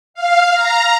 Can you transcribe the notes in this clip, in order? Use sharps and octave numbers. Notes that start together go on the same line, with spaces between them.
F5
A#5